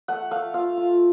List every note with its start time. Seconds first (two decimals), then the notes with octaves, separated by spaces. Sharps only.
0.08 A3 F#5
0.31 A3 F5
0.54 F4 F5
0.78 F4